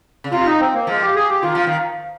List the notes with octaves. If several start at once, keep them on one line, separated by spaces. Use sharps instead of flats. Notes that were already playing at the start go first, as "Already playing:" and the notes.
C#3
C3 F4
D#4
C4
A#3
F3 G#3
G4
G#4
G4
D#3 F4
F3
D#3